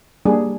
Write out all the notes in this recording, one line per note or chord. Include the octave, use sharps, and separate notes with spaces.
G3 A#3 D4 G#4